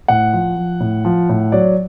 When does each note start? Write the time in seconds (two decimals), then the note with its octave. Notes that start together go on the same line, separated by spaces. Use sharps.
0.08 A2 F#5
0.33 F3
0.56 F3
0.80 A2
1.05 F3
1.29 A2
1.52 F#3 D5